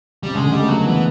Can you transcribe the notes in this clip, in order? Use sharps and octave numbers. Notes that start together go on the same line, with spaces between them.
G3
C3
C#3 G#3
D3
G3 G#3
A3
F#3 A#3
B3
E3
B3